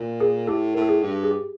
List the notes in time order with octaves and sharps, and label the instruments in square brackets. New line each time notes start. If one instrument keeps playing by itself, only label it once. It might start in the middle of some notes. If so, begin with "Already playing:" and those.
Already playing: [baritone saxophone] A#2
[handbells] G#4 A#4
[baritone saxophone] A2 [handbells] G4 A4
[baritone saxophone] A2 [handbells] A#4
[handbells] A4
G#4
[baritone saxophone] G2
[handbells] G#4
G4